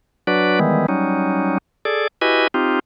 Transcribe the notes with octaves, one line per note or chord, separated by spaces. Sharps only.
F#3 D4 F#4 B4 D5
D#3 E3 G3 G#3 B3
F#3 G3 C#4 D#4
G#4 A4 D5
E4 F#4 G4 B4 D#5 G#5
C4 D#4 F4 G4